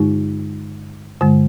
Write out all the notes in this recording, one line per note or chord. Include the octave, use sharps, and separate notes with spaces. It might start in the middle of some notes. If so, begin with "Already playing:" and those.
Already playing: G2 D3 G#3 D#4 G4
G2 D3 G#3